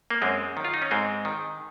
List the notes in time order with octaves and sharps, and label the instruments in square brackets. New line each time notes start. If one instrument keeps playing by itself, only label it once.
[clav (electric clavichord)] A#3
F#2 G#3 C4
D#3
F4
D#4
C#4
G#2 G#3 C4
D#3